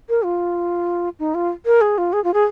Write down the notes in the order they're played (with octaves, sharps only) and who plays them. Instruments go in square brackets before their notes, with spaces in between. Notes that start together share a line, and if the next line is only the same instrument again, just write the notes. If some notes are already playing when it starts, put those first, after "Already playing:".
[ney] A#4
F4
D#4
F4
A#4
G#4
F4
G#4
F4
G#4